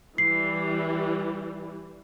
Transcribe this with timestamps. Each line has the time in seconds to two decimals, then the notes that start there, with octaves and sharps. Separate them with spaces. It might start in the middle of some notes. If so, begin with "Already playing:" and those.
0.18 E3 G3 C7